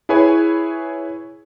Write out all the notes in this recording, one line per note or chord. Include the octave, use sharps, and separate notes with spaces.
E4 G#4 B4 C#5 G#5